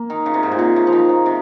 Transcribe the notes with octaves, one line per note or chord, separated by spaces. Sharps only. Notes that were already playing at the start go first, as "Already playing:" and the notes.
Already playing: A#3
D#3
C#3
C3
G#2
A#2
C3
C#3
F3
D#3
C#3
C3